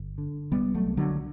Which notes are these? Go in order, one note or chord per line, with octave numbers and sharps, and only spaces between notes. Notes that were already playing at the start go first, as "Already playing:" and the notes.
Already playing: G1
D3
C2 G3 B3
F#3 A3
C2
D3 F#3